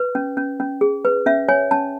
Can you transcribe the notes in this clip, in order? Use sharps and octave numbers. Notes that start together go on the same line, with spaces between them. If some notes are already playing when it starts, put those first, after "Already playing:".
Already playing: B4
C#4
C#4
C#4
G#4
B4
C#4 E5
C#5 G#5
C#4 A5